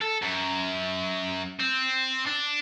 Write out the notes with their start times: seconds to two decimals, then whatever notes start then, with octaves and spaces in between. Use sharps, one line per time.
0.01 A4
0.22 F#2
1.60 C4
2.27 D4